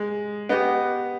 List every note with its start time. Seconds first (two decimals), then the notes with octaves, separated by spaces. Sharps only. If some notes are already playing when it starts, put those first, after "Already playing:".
Already playing: G#3
0.49 B3 G4 B4 D#5